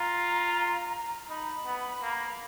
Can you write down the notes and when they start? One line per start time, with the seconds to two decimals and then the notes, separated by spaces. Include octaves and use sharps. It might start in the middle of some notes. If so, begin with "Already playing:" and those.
Already playing: F4 A#5
1.29 D#4 B5
1.66 B3
2.02 A#3